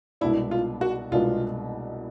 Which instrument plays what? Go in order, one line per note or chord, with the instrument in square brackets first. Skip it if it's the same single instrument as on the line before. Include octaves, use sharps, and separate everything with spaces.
[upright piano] C2 B2 G#3 B3 D4 [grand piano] E4
[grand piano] F4
F#4
[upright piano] C2 B2 G#3 B3 D4 [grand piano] F4